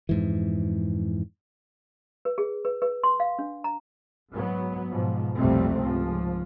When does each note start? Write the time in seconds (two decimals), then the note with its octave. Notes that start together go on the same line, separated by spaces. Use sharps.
0.09 F2 G#2 E3
2.25 B4
2.38 G#4
2.65 B4
2.82 B4
3.04 C6
3.20 F5
3.39 D4
3.64 A#5
4.32 G#2 F#3 B3
4.91 G#2 B2 F3
5.37 B1 F2 C3 G3 A3 C4
5.82 C#2 G#2 F3